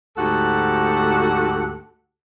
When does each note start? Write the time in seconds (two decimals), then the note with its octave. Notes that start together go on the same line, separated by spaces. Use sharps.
0.17 D2 G#2 F#4 G4 A4 F#5